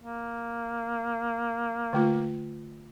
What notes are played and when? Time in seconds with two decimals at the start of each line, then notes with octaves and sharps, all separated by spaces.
0.01 A#3
1.93 D3 A3 F4